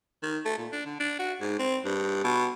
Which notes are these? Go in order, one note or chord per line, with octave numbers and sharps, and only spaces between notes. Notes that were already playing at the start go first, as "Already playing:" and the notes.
D#3
A3
A#2
D4
D3
D4
F#4
G#2
C4
G2
B2